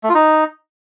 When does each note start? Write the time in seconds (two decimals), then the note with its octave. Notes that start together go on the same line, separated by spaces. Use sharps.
0.04 A3
0.09 F4
0.15 D#4